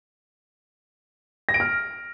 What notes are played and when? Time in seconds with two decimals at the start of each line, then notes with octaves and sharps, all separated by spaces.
1.49 A#6
1.54 D7
1.60 F6